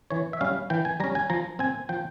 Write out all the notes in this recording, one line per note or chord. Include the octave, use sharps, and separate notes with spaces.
E3 C#5
E5
G3 C#4 F5
E3 G5
G#5
G3 C#4 A#5
G#5
F3 A#5
C4 G#5
F3 G5